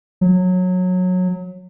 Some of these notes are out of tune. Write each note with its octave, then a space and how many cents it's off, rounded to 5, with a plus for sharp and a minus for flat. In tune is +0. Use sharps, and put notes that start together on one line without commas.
F#3 -20